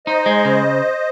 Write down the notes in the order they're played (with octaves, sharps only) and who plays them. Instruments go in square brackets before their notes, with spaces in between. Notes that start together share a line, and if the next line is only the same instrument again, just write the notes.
[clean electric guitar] D#4 [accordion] C5 D#5
[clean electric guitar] G#3
C#3